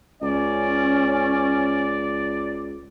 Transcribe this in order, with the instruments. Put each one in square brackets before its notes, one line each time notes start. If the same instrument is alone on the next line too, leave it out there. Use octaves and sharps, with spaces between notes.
[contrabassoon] C#2 [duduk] C#4 [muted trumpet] D5